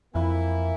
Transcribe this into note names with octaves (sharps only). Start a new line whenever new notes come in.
F2 E3 A#3 E4